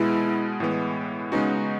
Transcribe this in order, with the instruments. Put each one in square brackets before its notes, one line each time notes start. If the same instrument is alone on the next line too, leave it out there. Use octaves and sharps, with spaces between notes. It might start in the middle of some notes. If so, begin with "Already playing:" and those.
Already playing: [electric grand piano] B2 G#3 B3 [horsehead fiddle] E4
[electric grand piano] A2 E3 G#3 B3
[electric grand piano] C#3 G#3 B3 D#4 F#4 [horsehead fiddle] C#4